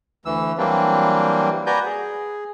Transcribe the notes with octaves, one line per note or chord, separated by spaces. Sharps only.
D2 E3 E6
E3 F#3 G3 A#3 C4 D4
F#4 B4 D5 G#5 A#5 G6
G#4